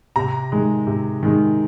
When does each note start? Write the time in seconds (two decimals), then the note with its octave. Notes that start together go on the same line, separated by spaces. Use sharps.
0.16 C3 A#5
0.52 D#3 G#3
0.87 C3
1.23 D#3 G#3